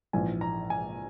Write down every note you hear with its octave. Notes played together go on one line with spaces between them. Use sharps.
A#1 G#2 E3 G#5
A#5
G#5